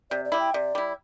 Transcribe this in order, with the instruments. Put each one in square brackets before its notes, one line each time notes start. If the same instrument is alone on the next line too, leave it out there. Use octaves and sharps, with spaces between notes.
[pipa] C3 [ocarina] D5
[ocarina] D5
[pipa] G3 E4
[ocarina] G5
[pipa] C3 [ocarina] D5
[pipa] G3 E4